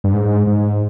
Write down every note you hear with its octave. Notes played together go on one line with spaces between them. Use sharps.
G2
G#2
G#2